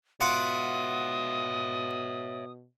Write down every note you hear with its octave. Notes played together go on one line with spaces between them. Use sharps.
B2 F4 C#5 E5 F#5 D6 D#6